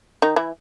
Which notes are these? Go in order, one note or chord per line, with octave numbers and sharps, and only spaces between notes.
D#3 D#4
E3 E4